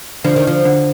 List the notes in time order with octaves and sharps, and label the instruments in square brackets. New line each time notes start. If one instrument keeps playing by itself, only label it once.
[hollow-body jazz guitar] D3 [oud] F3
[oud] D#3
F3
[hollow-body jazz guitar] D3